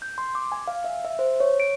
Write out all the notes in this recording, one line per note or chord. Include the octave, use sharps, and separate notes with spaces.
G6
C6
D6
G#5
F5
E5
E5
C5
C#5
D7